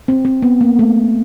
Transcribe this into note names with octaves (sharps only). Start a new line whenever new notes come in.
C4
C4
B3
A#3
A3